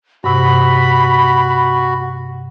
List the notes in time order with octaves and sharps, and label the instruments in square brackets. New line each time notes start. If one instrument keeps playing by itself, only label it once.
[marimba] G2 C3 [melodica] F#4 [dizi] B5